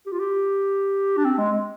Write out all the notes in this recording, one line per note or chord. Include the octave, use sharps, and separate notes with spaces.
G4
F4
G4
D4
C4
G#3